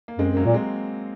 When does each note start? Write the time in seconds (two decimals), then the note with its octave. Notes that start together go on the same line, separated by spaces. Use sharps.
0.08 A#3
0.19 F#2 G#3 C4
0.32 F#2
0.36 F#3 A#3
0.45 A#2
0.54 G#3 C4